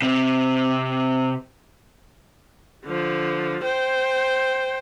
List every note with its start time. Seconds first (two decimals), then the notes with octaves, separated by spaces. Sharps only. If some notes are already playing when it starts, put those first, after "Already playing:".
0.02 C3 C4
2.86 D3 F3
3.64 C5 G5